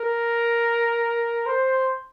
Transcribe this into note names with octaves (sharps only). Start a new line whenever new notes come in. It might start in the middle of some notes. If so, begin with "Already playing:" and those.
Already playing: A#4
C5